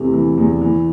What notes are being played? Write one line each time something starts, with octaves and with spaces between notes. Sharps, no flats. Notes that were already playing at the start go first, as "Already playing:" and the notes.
Already playing: E2 C3 E3 A3
E3
E2
E3